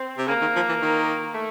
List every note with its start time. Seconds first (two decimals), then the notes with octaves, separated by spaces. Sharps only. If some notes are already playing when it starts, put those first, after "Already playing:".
Already playing: C4
0.18 C3
0.28 C#3 A#3
0.41 D#3
0.56 F3
0.69 E3
0.82 D#3
1.35 A3